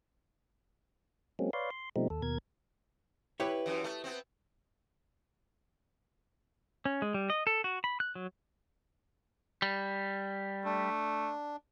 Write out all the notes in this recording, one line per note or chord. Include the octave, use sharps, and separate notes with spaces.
F#3 G#3 A#3 C4 C#4
B4 C#5 D5 F5 C6
C6
B2 F3 G3 A3 C4 D#4
D#2 A4
D#2 B2 A#4 G#6
E4 G4 B4 C#5
F#2 E3
A3
B3 C4
C#4
G#3
G3
D#5
A4
F#4
B5
F#6
F#3
G3
A3 D4